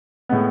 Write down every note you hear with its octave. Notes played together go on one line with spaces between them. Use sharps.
A2 G#3 B3